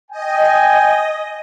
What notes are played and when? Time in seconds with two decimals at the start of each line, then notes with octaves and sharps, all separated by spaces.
0.11 D#5 G5 G#5